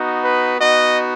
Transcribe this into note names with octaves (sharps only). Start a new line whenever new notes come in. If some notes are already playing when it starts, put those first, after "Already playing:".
Already playing: B3 D#4 F#4
B4
B3 D#4 F#4 D#5